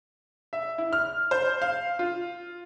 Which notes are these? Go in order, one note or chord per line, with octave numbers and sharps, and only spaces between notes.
E5
E4
F6
C5
F5
F4